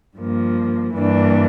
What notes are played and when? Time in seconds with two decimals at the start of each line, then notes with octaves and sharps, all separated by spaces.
0.17 G2 F3 A#3
0.95 G2 E3 A#3 D4